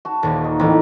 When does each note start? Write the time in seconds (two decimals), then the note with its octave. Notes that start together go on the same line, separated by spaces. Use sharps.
0.05 F#4 A5
0.23 D#1 D#2
0.44 D#4
0.60 A1 D#3 E3 C4